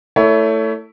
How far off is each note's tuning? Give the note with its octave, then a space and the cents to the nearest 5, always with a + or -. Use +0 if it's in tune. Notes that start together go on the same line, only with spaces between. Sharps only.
A3 +15 E4 +0 C#5 +25